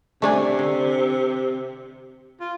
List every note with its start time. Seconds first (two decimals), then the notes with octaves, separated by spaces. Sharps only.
0.22 C3 A3 D4 G#5
0.59 D3
2.40 F4